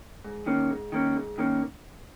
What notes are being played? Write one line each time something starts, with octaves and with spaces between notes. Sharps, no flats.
G#2
D#3 A#3 C#4
G#2
D#3 A#3 C#4
G#2
D#3 A#3 C#4